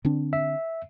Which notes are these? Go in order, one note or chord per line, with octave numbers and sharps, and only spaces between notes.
D3 C4 D4
E5